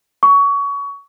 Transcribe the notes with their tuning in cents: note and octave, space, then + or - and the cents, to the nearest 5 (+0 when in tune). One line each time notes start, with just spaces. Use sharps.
C#6 +25